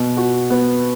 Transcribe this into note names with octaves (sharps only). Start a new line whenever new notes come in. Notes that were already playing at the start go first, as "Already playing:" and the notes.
Already playing: B2
F#4
B3